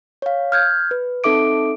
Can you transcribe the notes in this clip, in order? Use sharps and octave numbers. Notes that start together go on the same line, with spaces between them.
C#5 F5
F6 G6 G#6
B4
C4 D#4 A4 E5 D6 D7